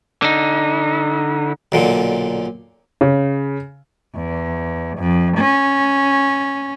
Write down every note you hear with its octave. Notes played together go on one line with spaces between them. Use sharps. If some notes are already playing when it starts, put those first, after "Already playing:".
D3 D#4
B1 A#2 D3
C#3
E2
F2
C#4